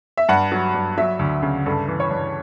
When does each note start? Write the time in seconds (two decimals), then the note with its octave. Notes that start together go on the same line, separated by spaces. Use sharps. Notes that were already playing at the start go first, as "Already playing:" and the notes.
0.17 E5
0.29 G2 F#5
0.52 F#3
0.75 G2
0.98 F#3 E5
1.19 D2
1.43 C#3
1.66 G2 A4
1.88 E3
2.00 C#5
2.11 G2